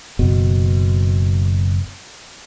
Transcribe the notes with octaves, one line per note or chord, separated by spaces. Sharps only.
F#1 B2